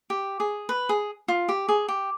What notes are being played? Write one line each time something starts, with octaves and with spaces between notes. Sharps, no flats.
G4
G#4
B4
G#4
F4
G4
G#4
G4